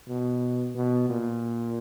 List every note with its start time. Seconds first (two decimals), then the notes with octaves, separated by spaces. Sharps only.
0.08 B2
0.75 B2
1.09 A#2